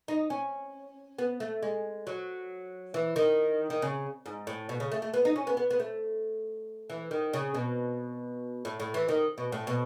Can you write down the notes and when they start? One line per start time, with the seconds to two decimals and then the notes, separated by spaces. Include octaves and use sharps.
0.08 D#4
0.30 C#4
1.19 B3
1.40 A3
1.63 G#3
2.07 F#3
2.94 E3
3.16 D#3
3.70 D#3
3.82 C#3
4.26 G#2
4.47 A2
4.69 B2
4.80 C#3
4.92 A3
5.02 A3
5.14 B3
5.25 D#4
5.36 C#4
5.47 B3
5.57 B3
5.71 B3
5.80 A3
6.90 E3
7.11 D#3
7.33 C#3
7.55 B2
8.65 A2
8.80 A2
8.94 E3
9.09 D#3
9.38 B2
9.52 A2
9.67 B2